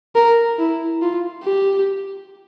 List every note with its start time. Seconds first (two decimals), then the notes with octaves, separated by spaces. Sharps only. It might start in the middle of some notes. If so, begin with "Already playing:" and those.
0.15 A#4
0.59 E4
1.02 F4
1.44 G4